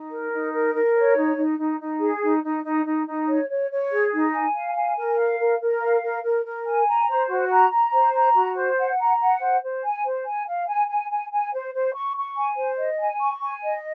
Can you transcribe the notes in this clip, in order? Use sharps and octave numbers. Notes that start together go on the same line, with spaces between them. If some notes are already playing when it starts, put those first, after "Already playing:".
Already playing: D#4
A#4
D#4
A#4
A#4
C#5
D#4
D#4
D#4
D#4
G#4
D#4
D#4
D#4
D#4
D#4
C#5
C#5
C#5
G#4
D#4
G#5
F5
G#5
A#4
F5
A#4
A#4
F5
A#4
A#4
A#4
G#5
A#5
C5
F#4
A#5
A#5
C5
A#5
F#4
C5
F#5
A#5
F#5
C5
C5
G#5
C5
G#5
F5
G#5
G#5
G#5
G#5
C5
C5
C#6
C#6
G#5
C5
D#5
G#5
C#6
G#5
D#5